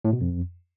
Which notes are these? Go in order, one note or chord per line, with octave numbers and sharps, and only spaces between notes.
A2
B2
F2